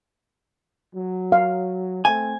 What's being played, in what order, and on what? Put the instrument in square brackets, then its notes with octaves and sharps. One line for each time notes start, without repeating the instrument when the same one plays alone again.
[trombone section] F#3
[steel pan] F5
[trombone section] A3 C4 [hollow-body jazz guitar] G#5